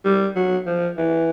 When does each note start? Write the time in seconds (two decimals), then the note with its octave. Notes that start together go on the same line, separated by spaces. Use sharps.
0.05 G3
0.36 F#3
0.66 F3
0.97 E3